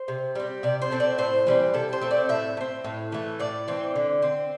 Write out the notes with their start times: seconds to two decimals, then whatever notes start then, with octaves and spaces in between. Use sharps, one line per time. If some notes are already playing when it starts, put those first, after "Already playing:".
Already playing: C5
0.08 C3
0.35 G3 C4
0.63 C3 D5
0.82 C5
0.91 A3 C4
1.00 D5
1.18 A2 C5
1.46 E3 G3 C4
1.74 C3 A4
1.93 C5
2.01 A3 C4
2.11 D5
2.29 A2 E5
2.57 A3
2.61 C4
2.84 A2
3.12 E3 A3
3.40 A2 D5
3.68 E3 C4
3.96 D3
4.22 C4